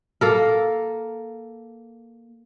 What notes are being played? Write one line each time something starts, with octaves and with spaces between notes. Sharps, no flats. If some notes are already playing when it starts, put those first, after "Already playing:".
A#3 A4 A#4